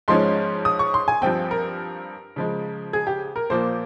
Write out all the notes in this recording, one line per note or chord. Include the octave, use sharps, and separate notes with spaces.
G#2 F3 G#3 C#4 C6
D#6
C#6
C6
G#5
G2 F3 C4 G5
A#4
C#3 F3 G#3
G#4
G4
A#4
A#2 F3 A#3 C5